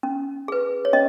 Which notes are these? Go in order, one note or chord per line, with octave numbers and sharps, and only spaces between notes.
C#4
G#4 B4
C#5
C#4 D#5